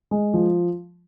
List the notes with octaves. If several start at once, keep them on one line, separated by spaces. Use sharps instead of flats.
G#3
F3